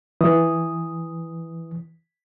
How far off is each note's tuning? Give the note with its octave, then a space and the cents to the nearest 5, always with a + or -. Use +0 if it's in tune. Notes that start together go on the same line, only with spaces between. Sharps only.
E3 +0 D#6 +0